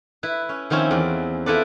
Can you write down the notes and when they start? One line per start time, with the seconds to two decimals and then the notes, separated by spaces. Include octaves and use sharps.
0.23 E4 B4
0.49 C#4
0.70 D#3 F3 C4 C#4 E4
0.91 E2 D5
1.46 E4 F4 A4 B4 D5